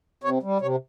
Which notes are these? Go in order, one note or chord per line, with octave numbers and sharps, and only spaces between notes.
C3 C#5
G3
C3 C#5